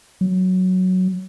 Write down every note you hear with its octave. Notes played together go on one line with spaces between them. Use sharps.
F#3